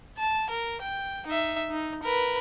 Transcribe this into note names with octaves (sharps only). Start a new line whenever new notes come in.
A5
A#4
G5
D#4 E5
D#4
A#4 B4